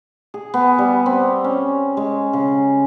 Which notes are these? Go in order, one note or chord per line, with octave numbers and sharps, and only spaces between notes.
G#4
B3
G3
C4
C#4
G#3
C#3